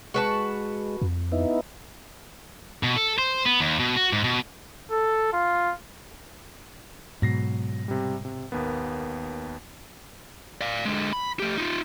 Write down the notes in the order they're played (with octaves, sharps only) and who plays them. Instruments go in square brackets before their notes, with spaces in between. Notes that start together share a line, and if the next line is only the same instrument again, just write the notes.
[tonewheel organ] G#3 [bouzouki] F#4 B4 A5
[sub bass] F2
[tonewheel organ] B3 D#4 E4
[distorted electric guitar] B2
A4
C5
B3
D#2
B2
F#4
G#2
B2
[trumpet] A4
F4
[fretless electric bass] G#2 B2 [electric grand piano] F#3 A#6 C7
[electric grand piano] C3 G3
C3
D#2 A#3 B3
[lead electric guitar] D5 F5
D3 G#3
B5
A3 G4
D#4 F4